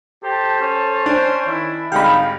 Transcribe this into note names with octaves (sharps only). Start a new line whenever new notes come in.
G4 A4 C5 A5
C#4
D4 C5 G#5
D#3 E4
G#1 D3 G3 G#3 D#4 F5 G5 B5